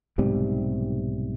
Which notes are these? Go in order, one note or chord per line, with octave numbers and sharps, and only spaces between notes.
B1 G#2 C3 G3